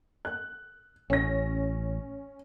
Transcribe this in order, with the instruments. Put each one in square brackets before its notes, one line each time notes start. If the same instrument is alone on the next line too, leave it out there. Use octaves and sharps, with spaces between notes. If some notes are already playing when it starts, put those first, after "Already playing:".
[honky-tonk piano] F#6
[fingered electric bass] A1 [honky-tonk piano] C#4 A#6